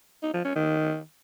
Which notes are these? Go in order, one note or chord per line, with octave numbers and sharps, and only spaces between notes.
D#4
F3
C#4
D#3